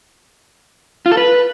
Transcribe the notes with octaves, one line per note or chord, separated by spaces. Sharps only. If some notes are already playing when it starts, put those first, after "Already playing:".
F4
A4
B4